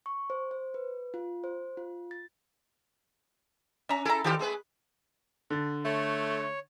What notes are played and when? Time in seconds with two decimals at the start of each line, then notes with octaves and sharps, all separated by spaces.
0.06 C#6
0.30 C5
0.51 C5
0.74 B4
1.14 F4
1.44 C5
1.77 F4
2.11 A6
3.89 C#4 E5 A#5
4.05 E4 G#4 A4 A#5
4.24 D#3 G3 G#3 F4 G4
4.39 A3 G#4 B4
5.50 D3 A6
5.86 A3 C#5